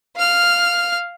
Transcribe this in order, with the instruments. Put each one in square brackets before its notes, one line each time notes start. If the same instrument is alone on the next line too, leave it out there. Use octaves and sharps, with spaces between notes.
[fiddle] F5 F6